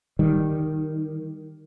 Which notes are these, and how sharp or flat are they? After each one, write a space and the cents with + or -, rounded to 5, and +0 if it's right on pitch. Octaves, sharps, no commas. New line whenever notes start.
D#3 +0 G3 +0